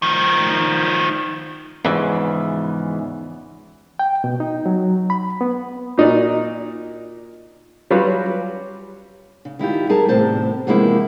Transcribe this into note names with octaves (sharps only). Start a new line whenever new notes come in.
D#3 F3
E2 G#2 C#3 E3 F3
G5
B2
D#4
F#3
B5
B3
A#2 D#4 F#4 D5
F#3 G3 C#4 F4 F#4 B4
C#3
D#3 E4 F4 G4
G3 G#4 A#4 A5
E2 A2 C3 C5 A5
E2 C3 F3 G#3 A#3 E4